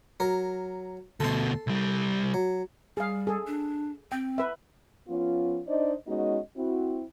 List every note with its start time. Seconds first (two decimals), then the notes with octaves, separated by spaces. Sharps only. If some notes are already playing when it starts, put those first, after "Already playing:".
0.20 F#3 A#4
1.20 D2 B2 A4 C6
1.67 C2 G3
2.34 F#3
2.97 G3 G#4 F5
3.27 G#4 A4
3.47 D4
4.12 C4 G5
4.38 B4 E5
5.09 F3 B3 C#4 F4
5.68 D4 D#4 C5 D5 D#5
6.07 G#3 B3 C#4 D#4 F#4 D#5
6.57 C4 E4 F#4